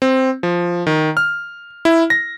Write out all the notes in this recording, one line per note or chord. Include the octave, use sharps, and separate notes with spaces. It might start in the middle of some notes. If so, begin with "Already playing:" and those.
C4
F3
D#3
F6
E4
A#6